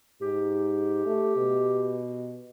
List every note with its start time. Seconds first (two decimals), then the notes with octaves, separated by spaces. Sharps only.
0.21 G#2 G4
1.06 A3
1.36 B2